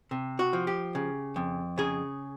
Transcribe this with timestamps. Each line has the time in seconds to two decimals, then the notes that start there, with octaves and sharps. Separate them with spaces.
0.11 C3
0.39 F#4
0.53 F3
0.67 G4
0.95 C#3
1.36 F2
1.78 C#3 G#4